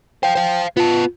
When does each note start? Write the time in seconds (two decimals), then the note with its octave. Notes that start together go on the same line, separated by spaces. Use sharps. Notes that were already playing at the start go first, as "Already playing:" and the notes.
0.23 C5 F5 G5
0.35 C5 F5
0.77 B3 F4 A5